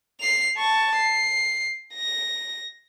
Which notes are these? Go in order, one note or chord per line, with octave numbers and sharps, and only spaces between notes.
C7 F7
A5 C#6
C7
A#6